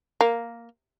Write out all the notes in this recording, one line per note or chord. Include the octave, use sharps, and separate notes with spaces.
A#3